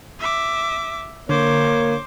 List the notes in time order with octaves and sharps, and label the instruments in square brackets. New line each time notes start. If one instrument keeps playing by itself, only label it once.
[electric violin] E5 D6
[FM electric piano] D3 [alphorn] A#3 [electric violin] C5 D6 [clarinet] C#5